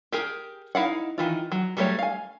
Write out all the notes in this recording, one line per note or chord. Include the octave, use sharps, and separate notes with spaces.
G4 G#4 A#4
D#4 E4 F5 F#5
D#3 E3 F4
F#3
F#3 G3 A3 G4 C#5
F5 G#5